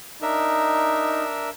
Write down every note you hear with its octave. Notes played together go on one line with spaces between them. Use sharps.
D4 D#4 A#4 E5